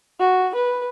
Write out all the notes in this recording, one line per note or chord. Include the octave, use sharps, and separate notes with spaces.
F#4
B4